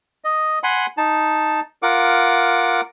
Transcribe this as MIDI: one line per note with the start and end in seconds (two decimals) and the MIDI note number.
0.24 0.59 75
0.64 0.86 78
0.64 0.86 80
0.64 0.86 83
0.64 0.86 84
0.97 1.60 63
0.97 1.60 81
1.83 2.81 65
1.83 2.81 70
1.83 2.81 78
1.83 2.81 86